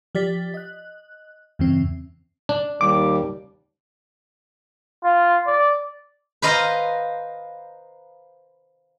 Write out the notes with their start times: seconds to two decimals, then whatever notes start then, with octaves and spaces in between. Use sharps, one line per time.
0.15 F3 G4 D5 A6 B6
0.54 D#5 F#6
1.59 E2 G2 C#3 E3 C4
2.49 D4
2.81 D#2 G3 D6
5.04 F4
5.47 D5
6.42 B4 C5 D#5 F5 A#5